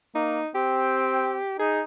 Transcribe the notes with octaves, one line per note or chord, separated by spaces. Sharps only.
A#3 D#4
C4 G4
D#4 G#4